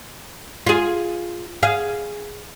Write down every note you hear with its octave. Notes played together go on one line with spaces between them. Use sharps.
F4 G#4
G#4 F5